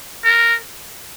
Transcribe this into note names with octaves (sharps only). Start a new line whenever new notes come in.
A#4